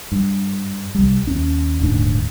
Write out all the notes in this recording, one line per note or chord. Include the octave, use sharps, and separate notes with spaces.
G2
C2 G3
D#2 C#4
D#1 D2 G#2 D4